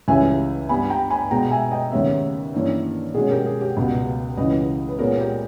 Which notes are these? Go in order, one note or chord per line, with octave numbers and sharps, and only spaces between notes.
C#2 C#3 E3 G3 C#4 E5 G#5
G2 G3 B3 G#5 B5
G5 A#5
G#5 B5
B2 G#3 B3 G5 A#5
E5 G#5
D#5 G5
D#2 C#3 G3 B3 C#5 E5
G2 E3 A#3 C#4
B2 G#3 C#4 G#4
G4 A#4
G#4
G4
C#2 B2 G3 B3
C#2 C#3 E3 B4 D#5
B4
A#2 G#3 B3 A#4 C#5
G4 A#4